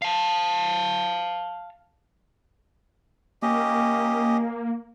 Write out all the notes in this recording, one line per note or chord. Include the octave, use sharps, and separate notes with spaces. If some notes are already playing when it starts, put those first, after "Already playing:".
F5 A5
A#3 C#4 G4 D#5